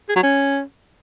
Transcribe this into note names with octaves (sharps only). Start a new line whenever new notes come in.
G#4
F#3
C#4